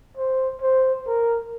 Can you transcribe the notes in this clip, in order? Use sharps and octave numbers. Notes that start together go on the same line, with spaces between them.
C5
C5
A#4